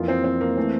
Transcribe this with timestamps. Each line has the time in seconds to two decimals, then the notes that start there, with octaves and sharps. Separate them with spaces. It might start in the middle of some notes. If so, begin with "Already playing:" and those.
Already playing: F2 E3 A#3 F4
0.08 C4
0.24 C4
0.41 A#3
0.57 E3 A3 C4